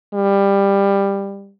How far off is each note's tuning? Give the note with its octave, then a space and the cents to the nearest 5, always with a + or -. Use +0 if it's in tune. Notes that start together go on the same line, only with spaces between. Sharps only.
G3 +15